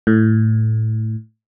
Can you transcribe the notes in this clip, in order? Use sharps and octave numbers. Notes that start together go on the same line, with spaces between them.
A2